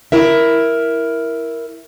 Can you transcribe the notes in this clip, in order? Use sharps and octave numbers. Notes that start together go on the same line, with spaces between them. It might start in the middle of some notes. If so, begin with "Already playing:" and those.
E4 A#4 E5